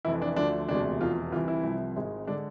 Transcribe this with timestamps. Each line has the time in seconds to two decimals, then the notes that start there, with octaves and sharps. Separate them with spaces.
0.05 F1 F2 E3 E4
0.22 D4
0.36 D2 D3 F3 D4
0.68 E1 D2 C3 G#3 D4
1.00 F1 E2 B2 F4
1.31 C2 C3 E3 F4
1.48 E4
1.63 C2 C3 F3
1.96 G#1 G#2 G#3
2.27 D3 G#3 D4